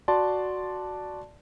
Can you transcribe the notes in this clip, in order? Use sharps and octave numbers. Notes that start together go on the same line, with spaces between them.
F#4 D5 A5 C6